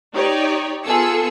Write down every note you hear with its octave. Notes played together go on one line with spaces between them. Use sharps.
D#4 G4 C#5 D5
B3 F4 G#4 A4 E6 C#7